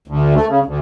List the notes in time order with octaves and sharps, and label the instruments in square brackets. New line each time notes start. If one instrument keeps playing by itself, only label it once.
[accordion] D2
A3
C#3
D2